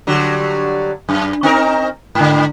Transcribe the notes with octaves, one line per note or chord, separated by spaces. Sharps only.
D3 F#3 G3
F#2
C4 D#4 A#4
G#2 D3